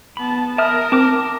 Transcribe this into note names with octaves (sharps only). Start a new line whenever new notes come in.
B3 A5 B5
A#4 E5 A5 D#6 F6
C4 A5 D6 F6